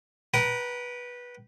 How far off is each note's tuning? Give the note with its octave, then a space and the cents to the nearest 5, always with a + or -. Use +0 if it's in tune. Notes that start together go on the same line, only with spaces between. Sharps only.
B4 -15 G5 -30 A#5 +0